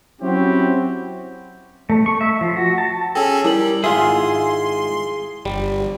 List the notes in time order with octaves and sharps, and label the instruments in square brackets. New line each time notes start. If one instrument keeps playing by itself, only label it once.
[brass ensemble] F#3 C4 C#4 E4 F#4 G4
[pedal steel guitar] A3
C#6
E5
F3
F#4
A5
[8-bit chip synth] C#4 G#4 A4 [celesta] G5 G#5 E6
[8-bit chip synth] G3 [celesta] E4 A#4 F#7
[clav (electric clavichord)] G#1 F4 E5 [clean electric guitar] G#4 [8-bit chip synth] C6
[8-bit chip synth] G1 [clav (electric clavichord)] G3